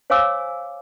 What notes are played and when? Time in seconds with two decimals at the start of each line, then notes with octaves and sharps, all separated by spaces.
0.10 C5 C#5 F5 G#5 D6 E6